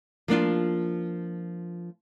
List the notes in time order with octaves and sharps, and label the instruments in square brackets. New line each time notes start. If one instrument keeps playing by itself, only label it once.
[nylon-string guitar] F3 A#3 D4 F4